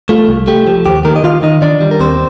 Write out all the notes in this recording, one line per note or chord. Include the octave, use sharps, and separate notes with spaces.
A3 F4
C2
A3 G4
F3
D#2 G4
D#3 A#3 A#4
D#5
D#3 F4 F5
D#3 D#4 D#5
D#3 D4 D5
G3
A#4
D#2 C4 C5